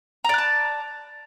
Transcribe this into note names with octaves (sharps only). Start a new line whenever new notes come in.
D5 A5 A#5 F#6